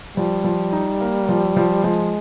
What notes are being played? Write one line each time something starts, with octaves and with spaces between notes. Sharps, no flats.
F3 G3
F3
D#4
A#3
F3
F3
F3 G#3